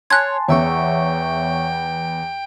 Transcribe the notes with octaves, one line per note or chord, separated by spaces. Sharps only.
C#5 G#5 A5 C6 F#6 G#6
E2 B3 C#5 E5 G5 C#6